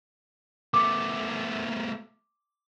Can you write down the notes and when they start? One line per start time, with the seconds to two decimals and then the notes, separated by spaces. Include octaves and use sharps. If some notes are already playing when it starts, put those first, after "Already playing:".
0.74 A3 B3 D6